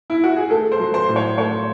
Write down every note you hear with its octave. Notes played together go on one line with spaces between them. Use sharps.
E4
F#4
G#4
A3 A4
C5
F#3
C5
A2
C#5
A3 C#5